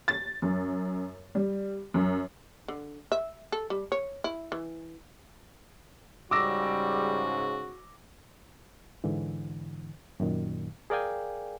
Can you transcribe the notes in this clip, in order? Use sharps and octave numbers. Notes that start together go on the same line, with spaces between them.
A6
F#2
G3
F#2
D3
E5
A4
G3
C#5
E4
E3
G#2 C#3 G3 F#4 D6 E6 A#6
G#2 D3 E3
F#2 A#2 D#3
G#4 A#4 D5 F5 G5 G#5